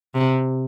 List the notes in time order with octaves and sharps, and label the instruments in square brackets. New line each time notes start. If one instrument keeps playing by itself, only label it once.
[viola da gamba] C3